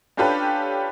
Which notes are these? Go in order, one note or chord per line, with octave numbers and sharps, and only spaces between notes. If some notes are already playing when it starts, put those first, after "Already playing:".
C#4 D4 F4 G4 A4 B4